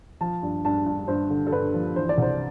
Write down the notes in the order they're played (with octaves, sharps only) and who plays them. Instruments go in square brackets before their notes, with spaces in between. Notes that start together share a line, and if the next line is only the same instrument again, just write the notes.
[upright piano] F3 A5
G2
G2 A5
G2
G2 C5
D3
A4
G2 B4
F3
E3 C5
D5
C2 C5